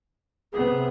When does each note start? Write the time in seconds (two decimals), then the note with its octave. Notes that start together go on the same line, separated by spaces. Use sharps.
0.53 C3 B3 G#4